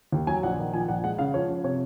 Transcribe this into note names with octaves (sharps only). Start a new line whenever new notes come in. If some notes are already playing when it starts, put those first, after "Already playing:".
D#2
F#3 G#5
A#1 F#5
D#3
F3 G#5
A#1 F#5
G#3 F#5
C#3 F5
F3 C#5
F3
C3 C#5